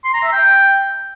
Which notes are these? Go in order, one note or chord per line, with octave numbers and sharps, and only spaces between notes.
C6
A#5
E5
G5